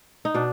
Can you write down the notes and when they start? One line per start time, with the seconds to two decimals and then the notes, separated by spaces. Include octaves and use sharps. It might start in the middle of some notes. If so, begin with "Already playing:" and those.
0.25 D#4
0.34 B2 D4